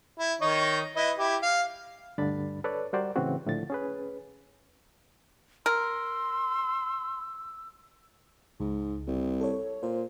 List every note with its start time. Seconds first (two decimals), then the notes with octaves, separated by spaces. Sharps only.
0.19 E4
0.41 D#3 D#4 C#5
0.96 E4 B4 D#5
1.18 E4 G4
1.42 F5
2.18 D2 G2 D3 D4 B5 A6
2.64 A4 B4 C#5 D5
2.93 G3 F#4 A#4 C5 D5
3.16 A2 C#3 E3 C4 F#4
3.45 C#2 A2 D3 F3 A6
3.70 C#4 G#4 B4
5.66 A#4 C6 E6
8.60 C#2 G#2
9.07 C2
9.41 A4 C#5
9.83 A#2 C5